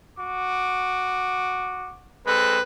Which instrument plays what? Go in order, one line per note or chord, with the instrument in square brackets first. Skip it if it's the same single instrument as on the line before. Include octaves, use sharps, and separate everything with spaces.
[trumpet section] F#4 D6
[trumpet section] G#3 C4 A4 [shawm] B4